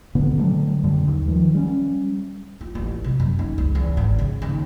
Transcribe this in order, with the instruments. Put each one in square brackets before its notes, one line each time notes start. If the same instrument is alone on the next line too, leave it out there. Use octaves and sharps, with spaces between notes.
[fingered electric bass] A2 D3 B3
D3 F#3 G3 A3
F#2 D3 G3
D#2
D#3 F3 G3
G3 C#4
[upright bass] F4
A1
C3
F#2
D#4
C#2
E2
G#1
C#3
D#2